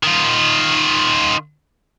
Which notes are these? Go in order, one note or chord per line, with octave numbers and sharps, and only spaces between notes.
D#3 F4